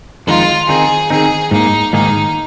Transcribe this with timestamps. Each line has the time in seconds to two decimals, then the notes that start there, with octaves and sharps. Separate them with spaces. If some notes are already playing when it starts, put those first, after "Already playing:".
0.27 F2 D#3 G#3 D#4 F4
0.68 D#3 C4 D#4 G#4
1.10 D#3 C4 D#4 G#4
1.51 G#2 D#3 A#3 D#4 G#4
1.93 G#2 D#3 A#3 D#4 G#4